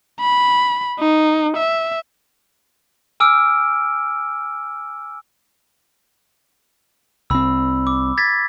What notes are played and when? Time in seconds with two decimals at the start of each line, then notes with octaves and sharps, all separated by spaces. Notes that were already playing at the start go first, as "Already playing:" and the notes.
0.20 B5
1.00 D#4
1.57 E5
3.20 G#5 D6 E6 F6 D7
7.30 C2 C4 B5 E6
7.87 D6
8.18 G#6 A6 B6